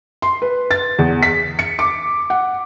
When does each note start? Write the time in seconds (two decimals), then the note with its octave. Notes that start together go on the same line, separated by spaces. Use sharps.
0.22 C6
0.42 B4
0.71 A6
0.99 E2
1.23 B6
1.59 C#7
1.79 D6
2.30 F#5